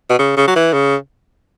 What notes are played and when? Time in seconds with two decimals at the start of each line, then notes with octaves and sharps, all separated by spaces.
0.10 B2
0.19 C#3
0.37 C#3
0.48 F#3
0.56 E3
0.73 C#3